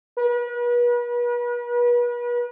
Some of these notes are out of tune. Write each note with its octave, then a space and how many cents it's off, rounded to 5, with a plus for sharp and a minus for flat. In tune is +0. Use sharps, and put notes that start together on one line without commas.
B4 -40